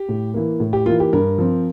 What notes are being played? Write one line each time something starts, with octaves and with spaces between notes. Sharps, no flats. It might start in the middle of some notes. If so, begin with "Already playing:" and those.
Already playing: G4
A2
E3 A#3
A2
G4
E3 A#3 F4
G4
G2 A#4
F3 C4